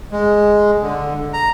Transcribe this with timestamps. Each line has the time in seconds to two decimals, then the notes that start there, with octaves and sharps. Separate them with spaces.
0.12 G#3
0.82 D3
1.33 A#5